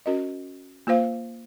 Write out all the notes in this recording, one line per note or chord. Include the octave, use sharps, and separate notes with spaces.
C#4 F#4 A#4 D#5
A#3 F4 C5 F5